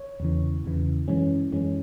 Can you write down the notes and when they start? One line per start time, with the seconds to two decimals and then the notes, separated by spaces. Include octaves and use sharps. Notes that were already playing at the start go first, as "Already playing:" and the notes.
Already playing: C#5
0.20 E2 C#3 E3
0.64 E2 C#3 E3
1.08 F#2 E3 G#3 C#4
1.52 F#2 E3 G#3 C#4